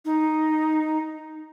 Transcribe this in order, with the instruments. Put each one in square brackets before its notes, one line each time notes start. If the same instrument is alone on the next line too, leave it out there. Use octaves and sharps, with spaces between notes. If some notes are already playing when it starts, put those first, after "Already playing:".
[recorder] D#4